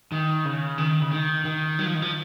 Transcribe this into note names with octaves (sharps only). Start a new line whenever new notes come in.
D#3
C#3
D#3
C#3
D#3
D#3
F#3
F3
D#3
F3